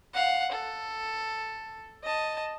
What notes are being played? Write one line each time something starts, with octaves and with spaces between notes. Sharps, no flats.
F5 F#5
A4
D#5 A5